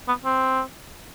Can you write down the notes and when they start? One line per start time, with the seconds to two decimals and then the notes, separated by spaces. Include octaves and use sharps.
0.08 B3
0.25 C4